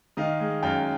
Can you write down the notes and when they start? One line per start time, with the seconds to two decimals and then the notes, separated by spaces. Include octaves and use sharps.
0.17 D#3 D#5 F5
0.40 G#3
0.62 F#2 F5 G5